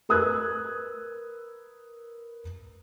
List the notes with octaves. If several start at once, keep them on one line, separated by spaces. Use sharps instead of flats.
A#4 B4 D#6 E6 F#6 G#6